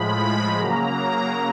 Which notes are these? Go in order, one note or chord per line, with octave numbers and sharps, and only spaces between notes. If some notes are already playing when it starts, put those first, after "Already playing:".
Already playing: A2 F3 G#3 B5
C#3 F#3 A#3 A#5